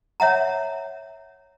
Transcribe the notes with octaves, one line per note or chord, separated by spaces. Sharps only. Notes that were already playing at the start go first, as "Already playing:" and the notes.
C#5 E5 F#5 A#5